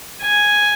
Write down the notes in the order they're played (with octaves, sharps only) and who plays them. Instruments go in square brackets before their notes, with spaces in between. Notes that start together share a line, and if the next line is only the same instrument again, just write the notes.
[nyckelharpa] G#5